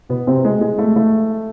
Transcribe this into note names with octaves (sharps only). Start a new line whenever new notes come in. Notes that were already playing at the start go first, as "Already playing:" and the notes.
B2 B3
C3 C4
G#3
G#3
A3
A3